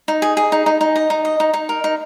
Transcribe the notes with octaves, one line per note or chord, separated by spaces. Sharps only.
D#4
G#4
G#4
D#4
D#4
D#4
D#5
D#4
D#5
D#4
D#4
A#4
D#4